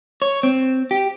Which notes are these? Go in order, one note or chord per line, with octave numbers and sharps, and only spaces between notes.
C#5
C4
G4